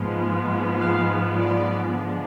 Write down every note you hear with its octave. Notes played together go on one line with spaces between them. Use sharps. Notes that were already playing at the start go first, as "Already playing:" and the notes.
Already playing: G#2 F3 G#3 B3 F4
F5
D5
D3 F3 G#3 B3 D4